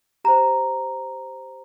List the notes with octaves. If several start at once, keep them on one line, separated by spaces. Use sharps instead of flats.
G4 C5 A#5